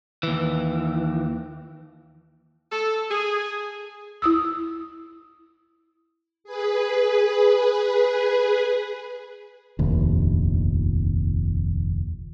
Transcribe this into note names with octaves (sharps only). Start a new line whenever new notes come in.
D#2 E3
A4
G#4
E4 D#6 E6
G#4 B4
F1 A#1 D#2